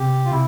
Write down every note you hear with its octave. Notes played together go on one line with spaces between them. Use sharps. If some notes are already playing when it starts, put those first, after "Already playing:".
Already playing: C3 G4
F4
C3 E4